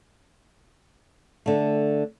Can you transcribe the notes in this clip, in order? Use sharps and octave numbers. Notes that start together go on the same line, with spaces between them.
D3 A3